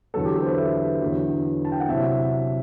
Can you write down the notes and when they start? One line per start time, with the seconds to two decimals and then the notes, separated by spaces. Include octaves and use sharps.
0.14 E2 D3 F#3 B3 A4
0.25 G4
0.36 A4
0.42 C5
0.48 B4
0.58 E5
1.02 E2 D3 F#3
1.65 A5
1.72 G5
1.80 F#5
1.88 C3 F#3 C4 E4 E5